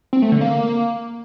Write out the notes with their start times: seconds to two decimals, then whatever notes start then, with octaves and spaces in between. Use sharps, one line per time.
0.13 C4
0.22 A3
0.32 D3
0.41 A#3